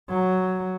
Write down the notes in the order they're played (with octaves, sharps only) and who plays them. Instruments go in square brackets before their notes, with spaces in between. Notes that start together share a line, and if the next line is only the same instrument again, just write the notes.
[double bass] F#3